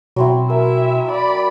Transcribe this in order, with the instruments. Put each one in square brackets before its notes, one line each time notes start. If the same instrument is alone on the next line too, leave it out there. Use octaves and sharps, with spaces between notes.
[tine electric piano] B2 [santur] F#3 C4 E4
[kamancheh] E4 E5 [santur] A#4 G#5
[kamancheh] D5 B5